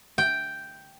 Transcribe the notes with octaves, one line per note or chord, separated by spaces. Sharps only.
G5